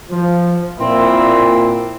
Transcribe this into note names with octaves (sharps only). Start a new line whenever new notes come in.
F3
A#2 C4 E4